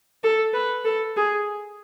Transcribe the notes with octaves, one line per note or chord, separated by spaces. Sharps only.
A4
B4
A4
G#4